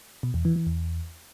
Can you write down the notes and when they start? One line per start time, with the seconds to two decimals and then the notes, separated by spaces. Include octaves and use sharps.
0.23 B2
0.34 E2
0.45 E3
0.56 E3
0.67 E2